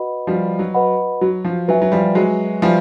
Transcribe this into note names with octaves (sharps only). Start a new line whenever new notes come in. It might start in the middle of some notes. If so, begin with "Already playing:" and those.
Already playing: F#4 B4 D#5 F#5 B5
F3 G3 F#4
F#3
B4 D#5 F#5 B5
F#3 F#4
F3
F#3 B4 E5 G#5
F#3
F3 G3
F#3 G#3 F#4
F3 G3 B4 E5 G#5